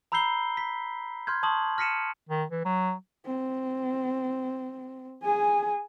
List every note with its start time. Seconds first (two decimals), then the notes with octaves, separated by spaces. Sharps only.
0.12 A#5 B5 E6 G6 C7 G7
0.57 B6
1.27 C6 F6 G6 G#6
1.43 A5 C6 C#6 D#6 F#7
1.78 F6 A#6 B6 C#7 D#7 E7
2.29 D#3
2.51 E3
2.65 F#3
3.26 C4
5.23 G#4 G#5